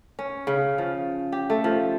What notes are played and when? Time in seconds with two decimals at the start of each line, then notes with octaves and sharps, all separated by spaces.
0.19 C#4
0.47 C#3
0.78 F3
1.32 G4
1.50 A3
1.64 F3